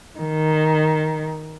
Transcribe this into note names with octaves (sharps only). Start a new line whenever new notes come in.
D#3